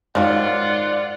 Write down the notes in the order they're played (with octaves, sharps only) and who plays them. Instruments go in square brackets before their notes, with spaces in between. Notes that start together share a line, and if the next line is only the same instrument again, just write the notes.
[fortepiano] G#2 [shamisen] D#3 F3 F#3 [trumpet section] F4 F#5 [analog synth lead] D5